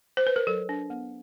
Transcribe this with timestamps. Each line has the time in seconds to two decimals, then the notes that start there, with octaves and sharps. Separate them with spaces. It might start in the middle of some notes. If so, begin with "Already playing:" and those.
0.17 C5
0.27 B4
0.36 A#4
0.47 F#3 A4
0.69 D4
0.90 B3